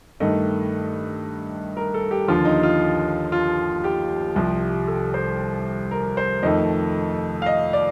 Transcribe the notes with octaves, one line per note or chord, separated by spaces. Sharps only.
G2 D#3 A3 D#5
A#4
A4
G4
D#2 D3 F3 F4
D#4
F4
F4
G4
C2 C3 F3
A4
C5
A#4
C5
F2 D#3 A3 D#5
F5
D#5
D5